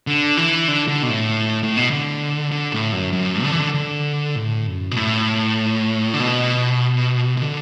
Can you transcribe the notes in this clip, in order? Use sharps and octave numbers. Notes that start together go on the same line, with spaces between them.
D3
E3
D3
D3
B2
A2
A2
B2
D3
D3
A2
F#2
F#2
D3
E3
D3
D3
A2
F#2
B2
A2
D3
B2
B2
D3